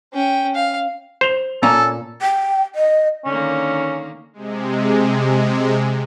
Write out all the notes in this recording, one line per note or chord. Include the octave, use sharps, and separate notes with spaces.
C#4 G5
F5
C5 F7 G7
A#2 A#3 C#4 A4 A#5
G5
D#5
D3 D#3 A#3 C#4
C3 G#3